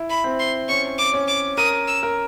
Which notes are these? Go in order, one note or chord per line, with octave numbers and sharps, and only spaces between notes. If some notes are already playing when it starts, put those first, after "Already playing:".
Already playing: E4
B5
C4
C6
C#4 C#6
D6
C#4
D6
A#4 D#6
E6
A#4